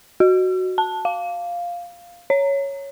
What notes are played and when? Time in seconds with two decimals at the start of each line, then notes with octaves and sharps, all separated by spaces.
0.20 F#4
0.78 A5
1.05 F5
2.30 C#5